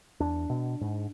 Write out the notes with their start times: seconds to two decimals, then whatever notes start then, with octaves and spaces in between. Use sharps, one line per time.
0.20 E2 D4
0.50 B2
0.81 G#2